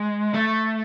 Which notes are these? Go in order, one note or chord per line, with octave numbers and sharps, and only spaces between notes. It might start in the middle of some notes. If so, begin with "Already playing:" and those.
Already playing: G#3
A3